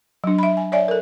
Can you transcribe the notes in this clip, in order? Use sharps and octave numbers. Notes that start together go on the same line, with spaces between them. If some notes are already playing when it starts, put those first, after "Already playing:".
F#3 D4
E5 B5
G#5
C#5 D5 E5 G#5
A4 A#4